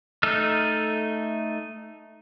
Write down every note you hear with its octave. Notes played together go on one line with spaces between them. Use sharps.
A3 D#4 A4 E6 F6